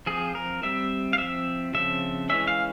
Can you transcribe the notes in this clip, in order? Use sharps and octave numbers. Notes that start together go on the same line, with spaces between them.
F3 C4 G#4
A#4
G3 C4 E5
F5
F3 C4 E5
C#3 F3 C4 E5
E3 G#3 C#4 E5
F5